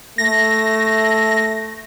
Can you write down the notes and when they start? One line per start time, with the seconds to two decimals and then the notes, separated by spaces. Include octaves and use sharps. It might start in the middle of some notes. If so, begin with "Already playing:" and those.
0.18 A3 A#6